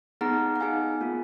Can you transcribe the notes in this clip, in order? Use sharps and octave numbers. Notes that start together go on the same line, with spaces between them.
B3 D#4 G#4 F#5 A#5
F#5
B3 D#4 G#4 F5 G#5
A#3 F4 G#4